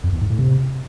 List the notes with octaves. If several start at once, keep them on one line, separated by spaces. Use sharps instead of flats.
F2
E2
G#2
A2
C3